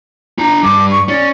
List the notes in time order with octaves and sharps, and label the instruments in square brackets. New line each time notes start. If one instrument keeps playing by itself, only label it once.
[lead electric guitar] D4 A#5
[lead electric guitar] G2 [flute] D6
[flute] C#6
[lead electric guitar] C#4 [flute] D5